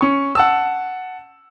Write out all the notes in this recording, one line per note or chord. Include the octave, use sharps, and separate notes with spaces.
C#4 C#6
F#5 A5 E6